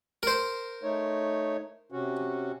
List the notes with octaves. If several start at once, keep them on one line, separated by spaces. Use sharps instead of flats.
A#4 C5
A3 D#4 C#5
C3 C#4 F#4